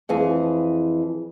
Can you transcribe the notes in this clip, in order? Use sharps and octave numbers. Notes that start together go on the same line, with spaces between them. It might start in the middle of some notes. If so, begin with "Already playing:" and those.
F2 E3 G#4